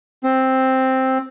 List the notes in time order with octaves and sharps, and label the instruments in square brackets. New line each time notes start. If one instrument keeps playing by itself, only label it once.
[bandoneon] C4